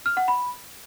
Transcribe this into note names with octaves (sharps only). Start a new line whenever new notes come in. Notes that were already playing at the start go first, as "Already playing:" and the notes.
F6
F#5
B5